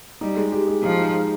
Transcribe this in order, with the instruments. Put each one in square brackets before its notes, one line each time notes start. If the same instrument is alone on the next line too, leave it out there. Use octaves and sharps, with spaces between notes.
[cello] G3 [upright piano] D#4
[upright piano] G#3
G4
G#3
[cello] F3 [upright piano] D#4
[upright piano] D#4
G#3